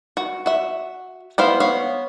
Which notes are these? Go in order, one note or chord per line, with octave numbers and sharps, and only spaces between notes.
F#4
F#4 E5
B3 E4 C5 F5
B3 C#5 F5